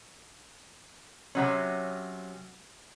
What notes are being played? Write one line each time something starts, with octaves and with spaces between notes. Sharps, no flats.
C3 F#3 C#4